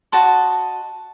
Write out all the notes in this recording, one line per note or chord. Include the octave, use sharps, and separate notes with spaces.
F#4 D#5 A5 C6